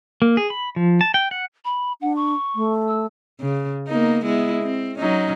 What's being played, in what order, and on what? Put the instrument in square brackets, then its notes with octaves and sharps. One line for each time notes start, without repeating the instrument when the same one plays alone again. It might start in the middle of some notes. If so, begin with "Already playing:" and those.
[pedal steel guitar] A#3
G#4
B5
F3
A5
G5
F#5
[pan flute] B5
[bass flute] D4 [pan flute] F#5
[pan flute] C#6
[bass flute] A3
[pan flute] E6
[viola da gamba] C#3
A#3 B3 D#4
G#3 B3 E4
C4
F#3 C#4 D#4